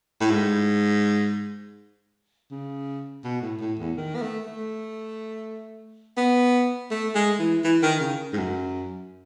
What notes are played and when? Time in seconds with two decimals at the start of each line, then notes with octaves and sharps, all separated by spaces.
0.21 A2
0.31 G#2
2.51 C#3
3.24 B2
3.42 A2
3.61 A2
3.79 E2
3.97 D#3
4.16 B3
4.22 A3
4.47 A3
6.17 B3
6.91 A3
7.15 G#3
7.39 E3
7.64 E3
7.83 D#3
8.01 C#3
8.33 G#2
8.37 F#2